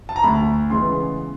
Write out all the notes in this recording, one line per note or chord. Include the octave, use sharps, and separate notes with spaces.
A5
A#5
D2 B5
C#3 E3 G#3 B3 C6